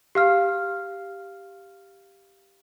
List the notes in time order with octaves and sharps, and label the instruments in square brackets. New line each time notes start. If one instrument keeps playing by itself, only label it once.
[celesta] G4 F5 F6